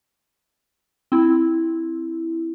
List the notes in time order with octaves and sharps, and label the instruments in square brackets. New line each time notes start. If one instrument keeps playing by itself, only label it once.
[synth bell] C4 E4